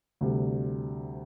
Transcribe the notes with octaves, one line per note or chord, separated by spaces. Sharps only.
D2 C3 G3